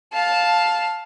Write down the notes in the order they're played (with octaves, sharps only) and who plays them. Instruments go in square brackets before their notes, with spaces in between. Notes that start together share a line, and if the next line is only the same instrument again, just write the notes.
[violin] F5 A5